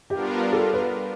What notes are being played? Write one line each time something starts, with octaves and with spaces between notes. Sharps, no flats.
G3 B3 D4 F4 G4 A#4
A4
B4